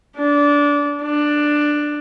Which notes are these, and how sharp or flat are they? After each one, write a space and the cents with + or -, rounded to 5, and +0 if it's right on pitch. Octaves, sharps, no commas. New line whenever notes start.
D4 -20
D4 +10